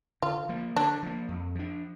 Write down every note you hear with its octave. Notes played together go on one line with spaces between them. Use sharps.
D3 F4
F3 A#3
D3 D4
F3 A#3
F2
F3 D4